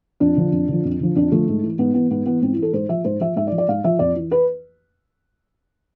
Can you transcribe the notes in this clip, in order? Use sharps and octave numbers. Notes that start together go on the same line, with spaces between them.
F2 D4
D3 F3
F2
D3 F3
F2
D3 F3
F2 D4
D3 F3 A3
G#2
E3
G#2 B3
E3 B3
G#2 B3
E3 B3
G#2 C4
E4
E3 A4
G#2 C5
F3 E5
G#2 C5
F3 E5
G#2 E5
D5
F3
D5
G#2 F5
F3 E5
F2 D5
E3
B4